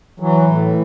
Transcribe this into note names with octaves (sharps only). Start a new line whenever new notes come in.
E3 F#3
A2